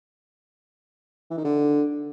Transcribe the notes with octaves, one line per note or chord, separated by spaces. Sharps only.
E3
D#3
D3